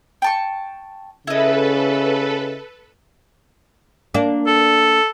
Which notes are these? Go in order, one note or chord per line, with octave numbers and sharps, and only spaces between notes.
G5 A5 C#6
C#3 E4 A4 B4 D#5
A#3 D4
A4